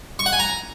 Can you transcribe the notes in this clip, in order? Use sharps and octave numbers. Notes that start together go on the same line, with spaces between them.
C#6
F#5
G#5
A#5